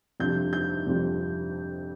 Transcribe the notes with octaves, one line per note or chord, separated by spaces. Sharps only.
F2 C3 G3 D4 F4 G6
G6
F2 C3 G3 D4 F4